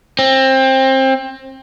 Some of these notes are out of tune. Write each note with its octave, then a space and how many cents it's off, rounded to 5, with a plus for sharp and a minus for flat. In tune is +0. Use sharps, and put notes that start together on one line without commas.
C4 +25